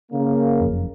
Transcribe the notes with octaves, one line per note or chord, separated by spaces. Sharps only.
C#3 A#3
F#1 F2